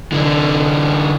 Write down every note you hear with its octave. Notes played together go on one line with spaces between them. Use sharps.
D3 E3